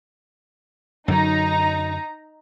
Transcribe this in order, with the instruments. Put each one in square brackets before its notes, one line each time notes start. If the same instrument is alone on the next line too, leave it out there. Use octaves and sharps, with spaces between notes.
[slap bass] F#2 D3 F#3 [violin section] D#4 A#5